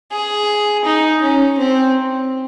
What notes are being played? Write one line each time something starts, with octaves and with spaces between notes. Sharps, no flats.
G#4
D#4
C#4
C4